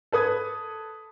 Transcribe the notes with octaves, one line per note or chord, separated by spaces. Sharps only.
A4 B4 D#6 G#6